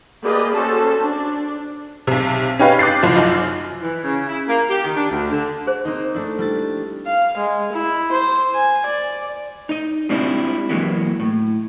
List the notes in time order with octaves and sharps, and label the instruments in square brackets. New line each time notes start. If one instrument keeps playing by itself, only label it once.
[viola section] A#3 G4 G#4 B4 D5 D#5
C#4 F#4 A4 C5 A5
D4
[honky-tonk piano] B1 C3
C#4 D#4 G4 B4 F5
D6 F#6 G6 A6 C7
F#1 C2 F3 C5
F#2 D#4 F4
[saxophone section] E3
C#3
E4
A#3
G4
D#3
D4
D2
D3
[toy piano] G#4 C5
[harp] A#3 C4 D#4
A3 D4 E4
G3 E4 A6
[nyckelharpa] F5
G#3
E4
C5
G#5
D5
[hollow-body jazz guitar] D#4 D#5
G3 G#3 C4 D4 E4 F4
E3 F#3 G#3 A#3 B3 E4
A2